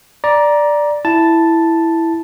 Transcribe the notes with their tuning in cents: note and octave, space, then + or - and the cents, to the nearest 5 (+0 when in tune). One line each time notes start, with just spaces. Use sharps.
D5 +0 A#5 +20
E4 +0 A5 +0